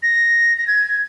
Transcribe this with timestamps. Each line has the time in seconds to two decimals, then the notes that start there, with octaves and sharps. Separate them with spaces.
0.03 A#6
0.58 A#6
0.67 G#6